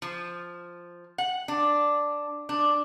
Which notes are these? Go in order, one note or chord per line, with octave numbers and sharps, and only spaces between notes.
F3
F#5
D4
D4